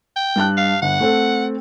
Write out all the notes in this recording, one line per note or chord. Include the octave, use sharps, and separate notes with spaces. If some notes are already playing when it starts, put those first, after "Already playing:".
G5
G2 A5 F#6
F5
G1 F#5
A3 C4 A4